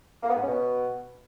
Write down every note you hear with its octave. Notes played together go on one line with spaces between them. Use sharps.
A#3
B3
G#2
C#4
B2